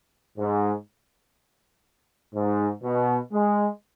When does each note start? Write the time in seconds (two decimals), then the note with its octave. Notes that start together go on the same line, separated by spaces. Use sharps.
0.38 G#2
2.34 G#2
2.83 B2
3.33 G#3